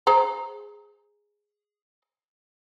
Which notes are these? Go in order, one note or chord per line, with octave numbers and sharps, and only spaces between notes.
G#4 C5 A#5